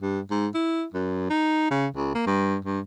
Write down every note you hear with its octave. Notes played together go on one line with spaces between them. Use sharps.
G2
G#2
E4
F#2
D#4
C#3
C#2
A#3
G2
G2